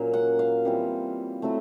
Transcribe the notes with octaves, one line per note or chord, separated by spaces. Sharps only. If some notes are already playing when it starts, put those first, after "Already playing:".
Already playing: A#2 F#3 A#3 C#4
F#5
F5
E3 G3 C4 F4
F#3 A3 C4 E4